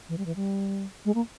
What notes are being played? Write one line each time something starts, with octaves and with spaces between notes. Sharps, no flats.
E3
G3
E3
G3
G#3
A#3